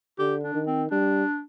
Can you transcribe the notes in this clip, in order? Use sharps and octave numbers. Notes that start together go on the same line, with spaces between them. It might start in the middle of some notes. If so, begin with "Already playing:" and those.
D3 G4
D4
D#3
C4
G3 D4